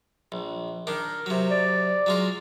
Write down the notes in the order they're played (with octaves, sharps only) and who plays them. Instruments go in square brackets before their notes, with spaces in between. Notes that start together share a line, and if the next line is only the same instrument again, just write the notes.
[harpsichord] A#1
[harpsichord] D#3 D4 [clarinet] A#4
[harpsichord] C3 F#3
[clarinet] D5
[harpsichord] F#3 G#3 F4 [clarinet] G#4